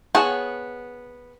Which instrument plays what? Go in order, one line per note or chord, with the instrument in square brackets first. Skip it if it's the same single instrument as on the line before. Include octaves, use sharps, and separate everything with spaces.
[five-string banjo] B3 G#4 C#5 F#5 A5